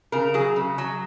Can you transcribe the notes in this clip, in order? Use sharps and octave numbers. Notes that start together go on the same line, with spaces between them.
C#3 A#4
F#3 G#4
C#3
F#3